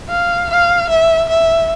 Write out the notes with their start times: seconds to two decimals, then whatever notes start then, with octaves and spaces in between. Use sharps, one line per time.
0.09 F5
0.50 F5
0.90 E5
1.29 E5